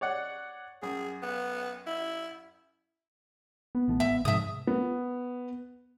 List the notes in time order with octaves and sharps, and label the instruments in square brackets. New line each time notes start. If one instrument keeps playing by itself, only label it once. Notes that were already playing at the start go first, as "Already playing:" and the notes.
[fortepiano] C#5 D5 F#5
[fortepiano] F#2 [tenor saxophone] G#4
[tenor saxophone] B3
E4
[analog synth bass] B3
[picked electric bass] A#1 E3 A3
[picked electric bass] G#1 [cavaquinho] E5
[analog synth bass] G#2 [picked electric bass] C3 F3 [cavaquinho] E5 D#6
[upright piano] B3